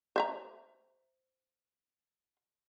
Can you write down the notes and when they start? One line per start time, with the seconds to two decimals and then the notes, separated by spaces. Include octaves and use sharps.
0.16 C5 E5 A#5